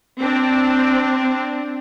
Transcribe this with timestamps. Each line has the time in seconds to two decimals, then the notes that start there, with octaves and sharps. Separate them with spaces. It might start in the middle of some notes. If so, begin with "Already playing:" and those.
0.19 C4 D4